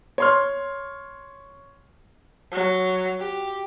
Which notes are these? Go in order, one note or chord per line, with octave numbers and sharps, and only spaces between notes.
C#5 C6 F6
F#3
G4